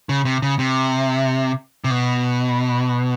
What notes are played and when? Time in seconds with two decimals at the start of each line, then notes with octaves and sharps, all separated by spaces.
0.09 C#3
0.25 C3
0.42 C#3
0.59 C3
1.84 C3
1.90 B2